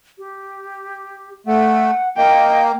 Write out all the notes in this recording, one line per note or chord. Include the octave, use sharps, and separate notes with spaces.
G4
A3 F#5
A#3 D#5 G5